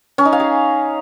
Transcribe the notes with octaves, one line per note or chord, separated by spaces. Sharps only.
C#4
D#4
F5
G#4